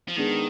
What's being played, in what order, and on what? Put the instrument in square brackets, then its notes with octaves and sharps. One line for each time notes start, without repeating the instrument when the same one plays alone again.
[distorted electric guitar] F3
[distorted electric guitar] D#3 [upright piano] G#3 B3 D4 G#4